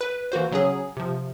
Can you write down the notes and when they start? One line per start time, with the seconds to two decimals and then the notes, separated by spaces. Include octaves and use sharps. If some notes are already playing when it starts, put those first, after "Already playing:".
0.01 B4
0.32 E3 A#3 F#4 C5
0.51 C#3 F#3 C#4 G#4
0.97 C3 F3